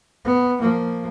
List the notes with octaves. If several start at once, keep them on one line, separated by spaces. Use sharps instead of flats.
B3
F3 A#3